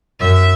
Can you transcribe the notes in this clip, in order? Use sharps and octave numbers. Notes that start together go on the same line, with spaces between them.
F#2 E5